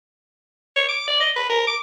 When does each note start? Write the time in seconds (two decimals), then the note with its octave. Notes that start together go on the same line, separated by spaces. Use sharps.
0.77 C#5
0.89 D6
1.08 D5
1.20 D#5
1.36 B4
1.50 A#4
1.67 D6